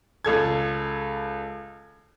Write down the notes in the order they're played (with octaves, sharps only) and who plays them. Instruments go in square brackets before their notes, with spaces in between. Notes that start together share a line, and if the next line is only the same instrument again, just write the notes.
[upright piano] C#2 A4 G#6